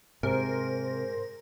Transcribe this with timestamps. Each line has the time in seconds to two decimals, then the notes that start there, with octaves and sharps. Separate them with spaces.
0.23 G#2 C3 A#4 C5